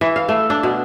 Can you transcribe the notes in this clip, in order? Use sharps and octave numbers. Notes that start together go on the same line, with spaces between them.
E3
F5
A3
D4
B2